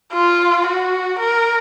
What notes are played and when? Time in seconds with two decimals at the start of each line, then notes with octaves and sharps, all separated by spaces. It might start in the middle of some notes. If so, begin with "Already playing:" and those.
0.13 F4
0.66 F#4
1.20 A#4